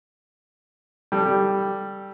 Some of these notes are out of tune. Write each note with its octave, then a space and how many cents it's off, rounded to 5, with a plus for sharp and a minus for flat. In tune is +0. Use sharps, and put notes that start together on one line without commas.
G3 +0 A4 +5